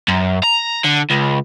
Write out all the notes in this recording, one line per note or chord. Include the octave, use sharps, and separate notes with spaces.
F#2
A#5
D3
C#2